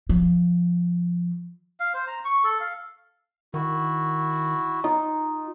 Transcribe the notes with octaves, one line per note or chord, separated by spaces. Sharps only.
F3
F5
C5
A#5
C#6
A4
F5
D#3 E4 F#4
D#4 F4